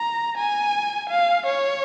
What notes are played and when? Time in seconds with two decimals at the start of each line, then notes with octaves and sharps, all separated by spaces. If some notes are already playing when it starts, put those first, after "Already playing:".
Already playing: A#5
0.37 G#5
1.09 F5
1.46 C#5